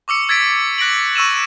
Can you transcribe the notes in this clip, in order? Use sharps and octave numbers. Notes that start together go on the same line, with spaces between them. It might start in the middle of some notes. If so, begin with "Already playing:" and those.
C#6 D6 E6 C#7
E6 G#6 A6 B6 D7
F#6 A#6 D7 F#7
C#6 E6 D#7 E7